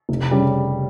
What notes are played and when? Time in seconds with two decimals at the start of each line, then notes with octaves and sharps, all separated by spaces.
0.09 F1
0.31 C#3 G3